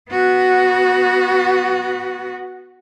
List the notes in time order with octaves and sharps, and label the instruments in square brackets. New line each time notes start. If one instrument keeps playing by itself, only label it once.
[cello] B3 F#4